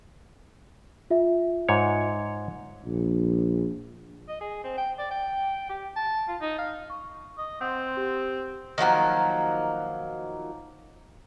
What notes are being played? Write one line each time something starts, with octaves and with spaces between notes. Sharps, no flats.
F4 E5
G#2 C#5
A#1
D#5
G#4
C4
G5
D5
G5
G4
A5
F4
D#4
F5
C#6
D#5
C4 F#5 C6
G4
D#3 F3 F#3 A#3